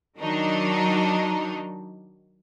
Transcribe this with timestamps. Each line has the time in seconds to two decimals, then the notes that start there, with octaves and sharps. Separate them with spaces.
0.18 D#3 F#3 D4 D#4